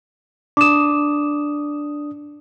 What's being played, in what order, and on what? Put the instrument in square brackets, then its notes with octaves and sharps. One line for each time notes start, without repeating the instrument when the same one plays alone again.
[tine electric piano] D4 D#6 [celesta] D6 E7